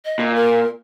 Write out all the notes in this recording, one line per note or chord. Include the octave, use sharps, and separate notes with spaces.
D#5
A#2
A#4